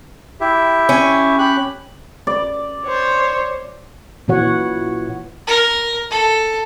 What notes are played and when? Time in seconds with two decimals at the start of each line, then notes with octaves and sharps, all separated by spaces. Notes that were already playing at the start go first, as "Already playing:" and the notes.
0.41 E4 G4 E5
0.89 C#4
1.39 G4 B5 F#6
2.27 D5
2.86 C5 C#5
4.28 A#2 E3 F#4 C#5 F#5
5.47 A#4
6.10 A4